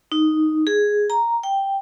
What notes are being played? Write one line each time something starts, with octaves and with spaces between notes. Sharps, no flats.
D#4
G#4
A#5
G5